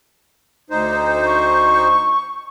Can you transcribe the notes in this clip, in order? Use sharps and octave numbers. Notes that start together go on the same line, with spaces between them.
D2 D#4 C5
C#6